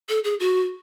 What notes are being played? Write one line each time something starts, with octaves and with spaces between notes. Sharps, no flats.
A4
G#4
F#4